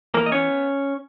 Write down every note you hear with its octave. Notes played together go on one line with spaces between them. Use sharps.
E3 A#3 A#4
D#5
B3 C#4 C#5